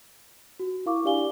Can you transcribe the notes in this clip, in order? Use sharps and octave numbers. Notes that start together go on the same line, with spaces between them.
F#4
E4 A#4 F5 C#6 D6
D4 G4 D5 F5 G#5 G7